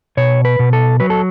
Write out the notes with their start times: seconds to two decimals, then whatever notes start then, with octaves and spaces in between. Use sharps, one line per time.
0.17 B2 C#5
0.45 B4
0.59 B2
0.73 A4
1.00 F#3 B4
1.10 A4